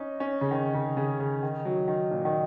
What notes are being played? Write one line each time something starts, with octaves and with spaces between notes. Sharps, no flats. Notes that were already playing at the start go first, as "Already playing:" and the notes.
Already playing: C#4 D#4
C#4
C#3
D#3
C#3
C#3
C#3
D#3
F#3
D#3
A#2
D#3